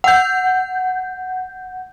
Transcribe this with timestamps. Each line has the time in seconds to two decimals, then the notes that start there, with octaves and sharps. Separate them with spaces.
0.04 F#5 G6